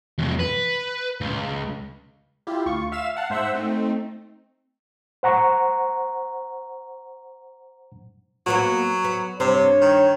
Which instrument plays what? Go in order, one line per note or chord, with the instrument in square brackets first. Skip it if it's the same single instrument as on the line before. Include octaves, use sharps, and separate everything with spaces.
[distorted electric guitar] E2 C3
B4
C#2
[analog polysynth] E4 F4 G4
D2 F4 C#6
E5 F5 E6 E7
F5 F#5 A5
G#2 C5 E5 F#5 E6
A3 C4 D#4
[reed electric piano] C5 F#5 A#5 C#6
[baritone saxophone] F#3 [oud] A#3 B3 F#4
[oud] B3
[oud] G2 C5 [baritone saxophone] C3 [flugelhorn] C#5
[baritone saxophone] D#3